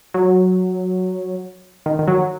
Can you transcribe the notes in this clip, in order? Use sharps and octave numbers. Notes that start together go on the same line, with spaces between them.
F#3
D#3
D#3
F#3